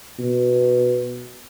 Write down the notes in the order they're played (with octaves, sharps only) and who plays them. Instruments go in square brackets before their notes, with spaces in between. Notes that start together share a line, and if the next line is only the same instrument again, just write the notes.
[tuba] B2